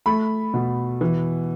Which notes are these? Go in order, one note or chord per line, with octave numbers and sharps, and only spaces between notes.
A3 B5
B2
E3